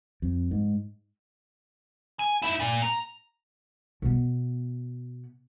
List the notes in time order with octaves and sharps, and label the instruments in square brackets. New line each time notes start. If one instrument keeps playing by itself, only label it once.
[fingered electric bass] F2
G#2
[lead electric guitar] G#5
D#4 E4
A#2
A#5
[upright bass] B2 B3